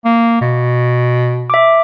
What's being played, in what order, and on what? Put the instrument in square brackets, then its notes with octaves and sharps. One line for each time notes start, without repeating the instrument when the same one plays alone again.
[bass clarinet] A#3
B2
[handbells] E5 D6